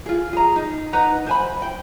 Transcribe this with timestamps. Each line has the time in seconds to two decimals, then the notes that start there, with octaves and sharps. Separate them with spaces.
0.06 F4 G#4
0.33 G#4 A#5
0.56 D#4
0.93 D#4 B4 F#5 A#5
1.27 C5 G#5 B5
1.62 G5